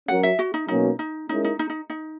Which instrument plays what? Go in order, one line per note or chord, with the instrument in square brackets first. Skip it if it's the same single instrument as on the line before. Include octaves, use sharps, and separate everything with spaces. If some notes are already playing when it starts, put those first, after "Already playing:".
[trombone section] F#3 C#4 F#4 A#4 [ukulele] F#5
[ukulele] E5
F#4
D#4
[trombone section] B2 F#3 A#3 C#4 [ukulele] D#4
[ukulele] D#4
[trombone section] G#3 C#4 E4 A#4 [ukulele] D#4
[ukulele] D#4
D#4
D#4
D#4